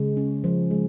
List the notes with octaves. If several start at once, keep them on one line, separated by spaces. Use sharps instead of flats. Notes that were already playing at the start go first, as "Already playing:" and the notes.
Already playing: C#3 G#3
C#4
F3
G#3